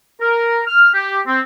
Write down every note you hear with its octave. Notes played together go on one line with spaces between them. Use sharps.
A#4
F6
G4
C4